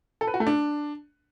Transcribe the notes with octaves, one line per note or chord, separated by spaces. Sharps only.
A4
B4
F#4
A3
D4